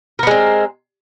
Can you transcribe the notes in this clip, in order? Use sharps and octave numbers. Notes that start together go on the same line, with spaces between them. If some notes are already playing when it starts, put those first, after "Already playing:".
G#3 B3 C4 A#4